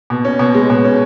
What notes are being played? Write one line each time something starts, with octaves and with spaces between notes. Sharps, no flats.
B2
C#4
B2
G#3
B2
C#4